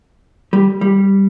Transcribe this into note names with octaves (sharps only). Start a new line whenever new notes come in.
G3
G3